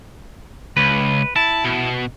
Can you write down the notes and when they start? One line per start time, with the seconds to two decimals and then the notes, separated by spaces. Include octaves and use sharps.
0.77 C#2 B4
1.36 E4 A5
1.64 B2